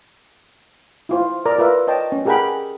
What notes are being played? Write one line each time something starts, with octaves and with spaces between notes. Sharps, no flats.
E4 F4 C5
A#4 D5 A#5
F4 A#4 B4 E5
C#5 D#5 G5 A5
C#4
G4 G#4 A#4 F#5 G5 B5